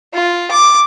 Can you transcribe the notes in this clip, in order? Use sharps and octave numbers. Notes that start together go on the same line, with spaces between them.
F4
D6